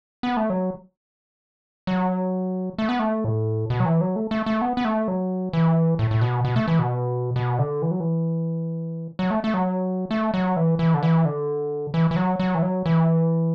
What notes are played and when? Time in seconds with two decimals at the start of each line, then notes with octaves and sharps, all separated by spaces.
0.23 B3
0.37 A3
0.50 F#3
1.87 F#3
2.78 A3
2.89 B3
2.99 A3
3.24 A2
3.70 B2
3.80 F#3
3.85 E3
4.01 F#3
4.16 A3
4.31 A3
4.46 A3
4.62 B3
4.77 B3
4.85 A3
5.08 F#3
5.53 E3
5.99 A2
6.11 A2
6.21 B2
6.45 B2
6.56 A3
6.68 E3
6.79 B2
7.36 B2
7.59 D3
7.82 E3
7.91 F#3
8.00 E3
9.19 F#3
9.31 A3
9.44 A3
9.54 F#3
10.11 A3
10.34 F#3
10.56 E3
10.79 E3
10.94 D3
11.03 E3
11.25 D3
11.94 E3
12.11 E3
12.16 F#3
12.40 F#3
12.55 E3
12.62 F#3
12.86 E3